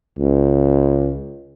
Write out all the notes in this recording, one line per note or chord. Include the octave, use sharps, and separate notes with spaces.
C#2